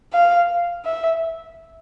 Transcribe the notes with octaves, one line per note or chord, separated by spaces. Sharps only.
F5
E5